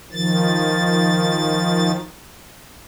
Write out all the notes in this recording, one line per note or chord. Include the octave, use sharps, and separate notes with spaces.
D#3 F3 A6